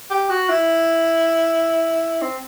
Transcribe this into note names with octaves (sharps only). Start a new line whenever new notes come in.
G4
F#4
E4
C4